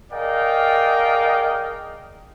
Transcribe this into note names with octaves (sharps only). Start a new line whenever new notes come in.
G#4 A#4 D5 D#5 F5 G5